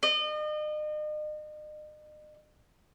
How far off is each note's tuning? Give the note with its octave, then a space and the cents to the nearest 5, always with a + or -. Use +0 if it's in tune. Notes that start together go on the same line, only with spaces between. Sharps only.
D#5 -40